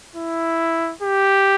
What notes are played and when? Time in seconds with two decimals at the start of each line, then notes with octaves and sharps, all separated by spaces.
0.16 E4
1.02 G4